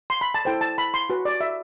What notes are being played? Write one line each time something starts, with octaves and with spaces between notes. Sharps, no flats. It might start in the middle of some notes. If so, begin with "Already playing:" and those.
C6
B5
A5
E4 A4 C5 G5
A5
B5
C6
F#4 B4
D5
E5